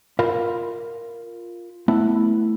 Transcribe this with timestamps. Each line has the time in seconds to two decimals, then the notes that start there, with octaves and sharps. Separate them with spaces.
0.19 F4 A#4 F5 B5
1.88 A3 B3 E4